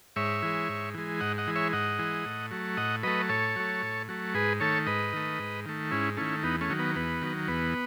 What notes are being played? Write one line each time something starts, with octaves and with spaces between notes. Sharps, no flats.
G#2 C#5 E5
E3 G#3
G#2
E3 G#3
G#2 D#5 F#5
D#5 F#5
E3 G#3
C#5 E5
G#2 D#5 F#5
E3 G#3
A2
F#3 A3
A2 D#5 F#5
F#3 A3 B4 D#5
A2 A4 C#5
F#3 A3
A2
F#3 A3
G#2 G#4 B4
D#3 A3 A4 C#5
G#2 B4 D#5
D#3 A3
G#2
D#3 A3
G#2 C#4 E4
D#3 A3 C#4 E4
E2 B3 D#4
A3 C#4
D#3 F#3
B3
E2 B3
D#3 F#3
E2 B3